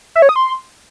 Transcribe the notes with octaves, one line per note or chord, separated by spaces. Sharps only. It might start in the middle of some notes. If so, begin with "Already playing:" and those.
E5
C#5
D#6
C6